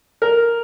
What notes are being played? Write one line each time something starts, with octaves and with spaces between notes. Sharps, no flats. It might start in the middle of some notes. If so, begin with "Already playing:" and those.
A#4